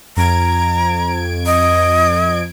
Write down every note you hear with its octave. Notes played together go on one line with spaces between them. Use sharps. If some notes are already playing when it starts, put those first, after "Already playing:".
F2 A#5 G#6 D7
D#5